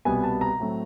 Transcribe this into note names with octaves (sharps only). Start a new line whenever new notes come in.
C2 B2 G3 B3 G#5
A5
A#5
A2 F#3 A3 C4